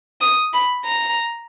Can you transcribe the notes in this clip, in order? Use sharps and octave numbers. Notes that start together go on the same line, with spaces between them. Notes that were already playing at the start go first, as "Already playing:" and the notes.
D#6
B5
A#5